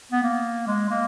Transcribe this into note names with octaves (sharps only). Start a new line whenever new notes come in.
B3
A#3
G#3
A#3